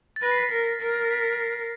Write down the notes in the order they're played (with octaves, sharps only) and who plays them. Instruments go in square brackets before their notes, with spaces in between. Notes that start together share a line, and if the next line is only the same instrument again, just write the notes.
[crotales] A6
[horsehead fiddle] B4 [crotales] A#6
[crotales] C7
B6
[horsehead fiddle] A#4
A#4
[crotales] B6
B6
C7